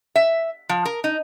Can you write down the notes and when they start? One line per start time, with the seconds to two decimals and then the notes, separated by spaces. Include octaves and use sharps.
0.15 E5
0.69 F3
0.85 A#4
1.04 D#4